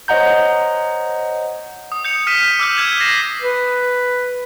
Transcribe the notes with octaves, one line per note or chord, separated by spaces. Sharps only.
C5 C#5 D#5 F#5 A#5 G6
D#6
G6 C#7 F7
D#6 F6 B6 D#7 E7
D6 E6 F6 G6
E6 F6 G6 G#6 E7
A#6 C7 E7
B4